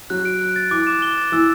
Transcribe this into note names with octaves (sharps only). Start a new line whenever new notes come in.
F#3 F#6
D7
F#6
A6
E3 D6
E7
G7
A6
E3 E6